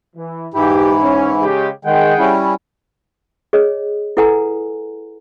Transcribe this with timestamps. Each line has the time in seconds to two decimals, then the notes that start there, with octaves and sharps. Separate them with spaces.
0.16 E3
0.54 G#2 E3 E4 G4
1.03 C#4
1.43 C#3 G#3 G4
1.85 D#3 G#3 G#4 F#5 G5
2.19 G3 C#4 E4
3.53 G#4 C#5 D#5
4.17 E4 A4 B4 F#5 G#5 A#5